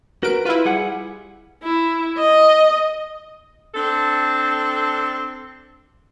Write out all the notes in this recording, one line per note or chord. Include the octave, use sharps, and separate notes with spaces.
F#4 A#4 B4 D7
E4 F4 B4
G3 G#4 F#5
E4
D#5
C4 D4 A4